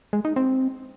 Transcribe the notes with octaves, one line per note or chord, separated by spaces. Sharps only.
G#3
D#4
C4